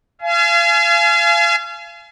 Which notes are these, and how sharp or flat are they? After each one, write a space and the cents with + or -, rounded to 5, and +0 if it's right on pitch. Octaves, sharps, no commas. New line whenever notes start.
F5 -35 G#5 +30